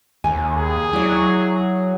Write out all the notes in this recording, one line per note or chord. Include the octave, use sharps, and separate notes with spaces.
D#2 G#5
G#4
F#3 E4 D5